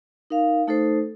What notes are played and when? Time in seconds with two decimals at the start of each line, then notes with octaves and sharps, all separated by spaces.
0.30 D#4 A#4 F5
0.67 A3 D#4 A4 C5